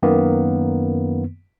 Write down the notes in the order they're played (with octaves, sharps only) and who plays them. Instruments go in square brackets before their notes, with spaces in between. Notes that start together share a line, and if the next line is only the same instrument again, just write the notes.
[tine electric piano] F#2 D#3 A#3 B3